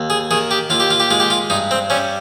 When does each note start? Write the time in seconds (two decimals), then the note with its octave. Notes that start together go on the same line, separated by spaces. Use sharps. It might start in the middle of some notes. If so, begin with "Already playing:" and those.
Already playing: D#2
0.10 G#4
0.31 D#3 G#4
0.51 G4
0.70 D#2 F4
0.80 G4
0.91 F4
1.00 G4
1.11 G#3 F4
1.20 G4
1.30 F4
1.50 G2 D#4
1.71 C4
1.90 G3 C#4